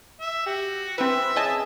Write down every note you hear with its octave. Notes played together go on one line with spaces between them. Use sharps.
E5
F#4 G4
E3 C4 B4 E5
C#3 D#5 G#5 A5